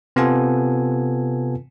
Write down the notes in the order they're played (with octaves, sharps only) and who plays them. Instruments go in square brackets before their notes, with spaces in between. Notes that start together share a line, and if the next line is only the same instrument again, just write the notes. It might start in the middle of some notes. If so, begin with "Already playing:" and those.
[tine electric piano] C3 B3 C4 F4 A4 G#5